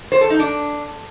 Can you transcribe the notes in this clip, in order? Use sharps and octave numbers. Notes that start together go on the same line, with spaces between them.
C5
A4
D#4
D4